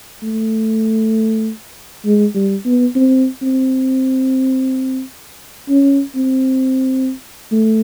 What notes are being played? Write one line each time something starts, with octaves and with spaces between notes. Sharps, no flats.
A3
G#3
G3
B3
C4
C4
C#4
C4
A3